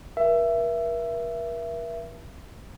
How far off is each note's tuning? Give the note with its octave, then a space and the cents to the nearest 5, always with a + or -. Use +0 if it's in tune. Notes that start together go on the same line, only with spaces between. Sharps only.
A#4 +45 E5 +20